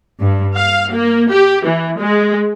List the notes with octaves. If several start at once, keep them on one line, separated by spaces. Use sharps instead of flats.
G2
F5
A#3
G4
E3
G#3